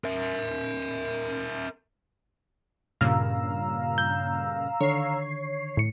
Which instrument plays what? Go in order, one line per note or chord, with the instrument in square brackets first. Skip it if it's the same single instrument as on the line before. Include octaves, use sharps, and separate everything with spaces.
[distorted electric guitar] A#4 E5
[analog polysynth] G2 A#2 C#3 [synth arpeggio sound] F5 A#5 E6
[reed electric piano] G6
[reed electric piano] D3 D#3 [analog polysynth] C#5 C7
[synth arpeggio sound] A2 C#7